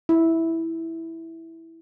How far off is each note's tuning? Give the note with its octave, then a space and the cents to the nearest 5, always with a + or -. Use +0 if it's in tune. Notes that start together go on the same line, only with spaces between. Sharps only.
E4 -10